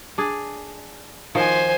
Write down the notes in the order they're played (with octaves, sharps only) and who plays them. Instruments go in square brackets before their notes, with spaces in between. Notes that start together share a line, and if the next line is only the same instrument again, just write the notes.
[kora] D4 G#4
[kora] D#3 F3 F#4 [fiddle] C5 G#5